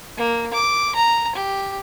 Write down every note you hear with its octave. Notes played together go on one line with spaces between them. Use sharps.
A#3
D6
A#5
G4